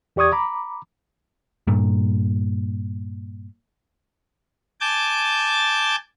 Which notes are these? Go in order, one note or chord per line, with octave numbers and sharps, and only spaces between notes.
E2 G4 D5 C#6 D#6 G#6
A#5 B5 D6
G2 A#2
G#5 A5 D6 G6 A6